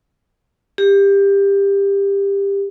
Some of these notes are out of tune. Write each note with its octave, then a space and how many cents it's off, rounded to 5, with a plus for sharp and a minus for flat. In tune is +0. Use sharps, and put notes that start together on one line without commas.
G4 +20